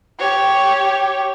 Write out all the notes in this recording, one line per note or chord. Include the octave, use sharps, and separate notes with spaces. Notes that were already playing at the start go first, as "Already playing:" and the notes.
G4 C#5